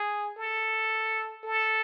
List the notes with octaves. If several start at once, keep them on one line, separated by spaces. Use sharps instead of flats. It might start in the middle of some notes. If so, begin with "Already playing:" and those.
Already playing: G#4
A4
A4